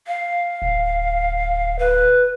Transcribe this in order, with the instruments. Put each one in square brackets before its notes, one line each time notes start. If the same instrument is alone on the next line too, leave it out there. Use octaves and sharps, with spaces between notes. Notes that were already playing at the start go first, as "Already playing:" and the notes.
[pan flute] F5
[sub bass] D1
[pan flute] B4